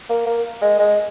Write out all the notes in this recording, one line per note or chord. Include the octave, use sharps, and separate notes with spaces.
A#3
A#3
G#3
G#3